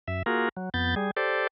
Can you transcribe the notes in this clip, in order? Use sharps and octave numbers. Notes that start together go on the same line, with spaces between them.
F#2 E5
A#3 F4 F#4 G#4 A#4
F#3
F2 B3 G6 A6
G3 G#4
G4 A4 C5 D5